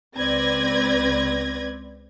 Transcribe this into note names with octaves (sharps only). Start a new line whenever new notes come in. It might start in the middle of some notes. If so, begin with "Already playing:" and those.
C#2 C4 B4 D5 G#6 A#6